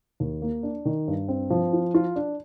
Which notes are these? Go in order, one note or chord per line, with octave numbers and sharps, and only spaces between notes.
D#2
A#3
D4
D#3
G2
C4
F3
F4
F4
D4